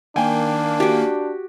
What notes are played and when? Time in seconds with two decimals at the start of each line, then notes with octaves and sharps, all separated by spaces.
0.16 D#3 A#3 D4 G5 G#5
0.80 F#4 G4